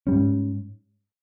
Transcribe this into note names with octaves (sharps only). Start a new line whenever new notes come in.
G#2 G3 C#4